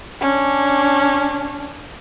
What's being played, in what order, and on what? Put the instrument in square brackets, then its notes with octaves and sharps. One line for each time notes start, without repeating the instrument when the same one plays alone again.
[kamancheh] C#4 D4